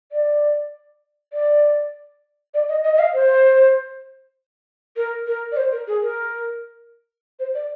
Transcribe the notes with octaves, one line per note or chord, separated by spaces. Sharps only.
D5
D5
D5
D#5
D#5
D#5
F5
C5
A#4
A#4
D5
C5
A#4
G#4
A#4
C5
D5